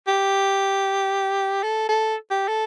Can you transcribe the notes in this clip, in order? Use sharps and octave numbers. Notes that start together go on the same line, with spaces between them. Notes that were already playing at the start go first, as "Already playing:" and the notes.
G4
A4
A4
G4
A4